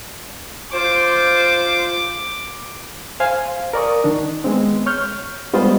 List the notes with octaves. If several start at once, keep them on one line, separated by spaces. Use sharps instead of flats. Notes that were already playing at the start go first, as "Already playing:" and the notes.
F4 C5 D6
C5 F5 G#5
A#4 D5 C#6 D#6
D#3 D4
G#3 B3 C4
C#5 C#6 F6 G6
G3 G#3 B3 F4 C5 D#5